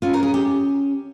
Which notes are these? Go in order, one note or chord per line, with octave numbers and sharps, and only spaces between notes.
C#4 F4
A#4
G#4
G4